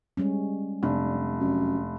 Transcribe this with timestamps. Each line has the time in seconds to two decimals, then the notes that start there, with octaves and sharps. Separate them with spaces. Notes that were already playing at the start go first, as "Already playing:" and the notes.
0.17 G3 G#3 C#4
0.83 F1 D4
1.40 F#2